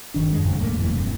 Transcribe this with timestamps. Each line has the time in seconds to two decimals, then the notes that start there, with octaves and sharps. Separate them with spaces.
0.14 G1 D#3 D4
0.32 F#2 G#3
0.45 F2 A2 C#3
0.61 D#2 A3 A#3
0.78 F1 A#1 F2 E3
0.91 F1 G2 C3